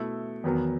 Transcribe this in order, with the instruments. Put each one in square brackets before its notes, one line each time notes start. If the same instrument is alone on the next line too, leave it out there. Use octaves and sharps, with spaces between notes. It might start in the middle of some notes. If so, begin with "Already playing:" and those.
Already playing: [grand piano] B2 A3 E4
E2 D#3 F#3 B3